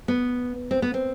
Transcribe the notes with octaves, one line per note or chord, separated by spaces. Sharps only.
B3
C4
B3
C4